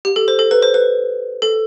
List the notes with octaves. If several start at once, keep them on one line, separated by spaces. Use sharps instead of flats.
G4
A4
C5
A4
B4
C5
B4
A4